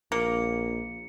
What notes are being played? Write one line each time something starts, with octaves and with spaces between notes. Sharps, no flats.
A#1 A#3 A#4 C#7